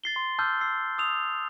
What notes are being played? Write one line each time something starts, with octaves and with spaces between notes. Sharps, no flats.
A6 C7 G7
C6
A5 D6 E6 F6 G6
E6 C7
D#6 E6 F7